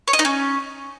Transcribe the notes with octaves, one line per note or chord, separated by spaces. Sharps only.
C#5
D#5
D#4
C#4